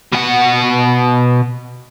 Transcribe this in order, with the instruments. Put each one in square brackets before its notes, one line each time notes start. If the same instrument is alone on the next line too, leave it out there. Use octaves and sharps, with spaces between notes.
[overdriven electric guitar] B2 F#5